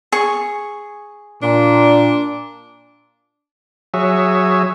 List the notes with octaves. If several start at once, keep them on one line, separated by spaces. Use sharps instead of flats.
G#4 C#6
A#2 D4
F#3 G#4 C#5 E5